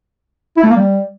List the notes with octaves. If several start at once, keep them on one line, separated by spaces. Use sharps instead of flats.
E4
A3
A#3
G3